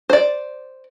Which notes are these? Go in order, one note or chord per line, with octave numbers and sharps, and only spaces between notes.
C5 D5